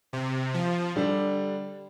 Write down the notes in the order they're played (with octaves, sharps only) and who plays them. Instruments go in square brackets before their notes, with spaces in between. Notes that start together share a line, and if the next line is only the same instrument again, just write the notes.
[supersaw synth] C3
F3
[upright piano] D3 G3 D4